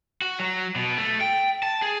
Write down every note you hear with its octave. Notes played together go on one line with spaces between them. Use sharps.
F#4
F#3
B2
A3
G5
A5
G#4